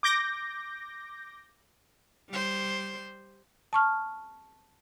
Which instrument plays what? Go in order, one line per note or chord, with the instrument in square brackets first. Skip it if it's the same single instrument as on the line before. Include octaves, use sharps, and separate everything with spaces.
[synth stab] D6 G6 A#6
[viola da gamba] G3 C5
[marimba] A5 C#6 F6